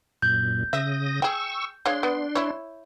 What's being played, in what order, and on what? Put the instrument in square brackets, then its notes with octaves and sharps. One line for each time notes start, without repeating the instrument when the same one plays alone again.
[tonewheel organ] F#2 A#2 [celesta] G6
[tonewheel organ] C#3 D#6 A#6 [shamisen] E5
[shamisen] G#4 G5 [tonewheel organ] C#6 E6
[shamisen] G#3 C#5 F5 [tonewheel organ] D4 C6
[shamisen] B3
E4 C#5